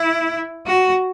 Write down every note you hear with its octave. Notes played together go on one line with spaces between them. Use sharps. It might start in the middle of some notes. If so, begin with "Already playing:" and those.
Already playing: E4
F#4